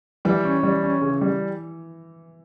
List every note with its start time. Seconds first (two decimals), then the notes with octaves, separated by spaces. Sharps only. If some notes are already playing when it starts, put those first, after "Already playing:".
0.25 E3 G3
0.45 C#4
0.63 G3
0.83 C#4
1.01 C#3
1.21 G3